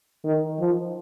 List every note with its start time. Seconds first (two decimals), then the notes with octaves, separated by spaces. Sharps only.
0.25 D#3
0.60 F3